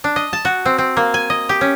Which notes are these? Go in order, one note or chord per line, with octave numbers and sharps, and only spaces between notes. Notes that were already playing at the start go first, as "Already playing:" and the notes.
D4
D#5
A5
F#4
C4
C4
A#3
G#5
D#5
G4
C#4